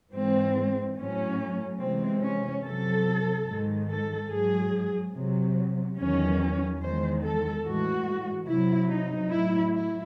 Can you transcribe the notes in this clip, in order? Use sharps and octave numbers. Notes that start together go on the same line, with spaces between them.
G#2 E3 G#3 C4
A2 F#3 C#4
C3 E3 G#3 C4
C#4
C3 F#3 A4
G#2 D#3 G#3
A4
G#2 F#3 G#4
C3 F#3
E2 D#3 F#3 C#4
E2 D#3 G#3 C5
A4
A2 E3 G#3 F#4
C3 F#3 E4
D#4
A2 F#3 E4
E4